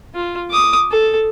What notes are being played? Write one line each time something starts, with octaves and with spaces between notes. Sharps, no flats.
F4
D6 D#6
A4